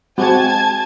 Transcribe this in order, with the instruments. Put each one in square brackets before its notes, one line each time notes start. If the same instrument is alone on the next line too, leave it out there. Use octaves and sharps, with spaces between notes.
[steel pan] G#3 C4 F#4 [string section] G#5 A5 G#6